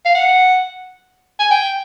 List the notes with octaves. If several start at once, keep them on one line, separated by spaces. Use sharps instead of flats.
F5
F#5
G#5
G5